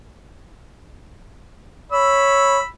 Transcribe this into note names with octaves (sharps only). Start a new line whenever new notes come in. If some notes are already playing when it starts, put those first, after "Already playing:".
C#5 B5 E6